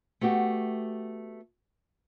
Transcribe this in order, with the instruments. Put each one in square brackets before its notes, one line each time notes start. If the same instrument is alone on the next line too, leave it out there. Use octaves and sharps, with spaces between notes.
[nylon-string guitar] A3 B3 F#4 G4